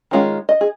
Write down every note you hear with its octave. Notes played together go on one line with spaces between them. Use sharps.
D#3 G#3 C#4 F4
D#5
G#4